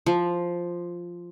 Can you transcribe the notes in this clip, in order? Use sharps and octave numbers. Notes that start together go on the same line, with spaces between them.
F3